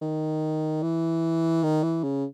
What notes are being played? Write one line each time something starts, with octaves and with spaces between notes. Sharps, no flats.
D#3
E3
D#3
E3
C#3